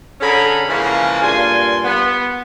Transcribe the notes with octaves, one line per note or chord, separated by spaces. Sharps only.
D3 C#4 G#4 A#5 B5
C#3 E3 F3 G#3 A#3
G2 A#2 G#5 C6
B3